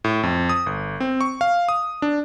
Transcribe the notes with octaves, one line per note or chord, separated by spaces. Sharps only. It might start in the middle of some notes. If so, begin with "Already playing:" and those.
A2
F2
D#6
G1
C4
C#6
F5
D#6
D4